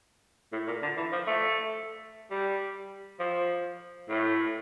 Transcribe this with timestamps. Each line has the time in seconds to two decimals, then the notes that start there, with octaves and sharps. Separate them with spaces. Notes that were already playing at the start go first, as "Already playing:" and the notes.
0.53 A2
0.67 A#2
0.82 D3
0.97 E3
1.12 F3
1.27 A3
2.31 G3
3.20 F3
4.09 A2